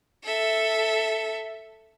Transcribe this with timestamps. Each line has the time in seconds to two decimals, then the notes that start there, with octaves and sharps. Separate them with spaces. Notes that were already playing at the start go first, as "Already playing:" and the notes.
0.24 A4 E5